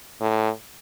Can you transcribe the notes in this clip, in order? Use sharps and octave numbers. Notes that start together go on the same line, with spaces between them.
A2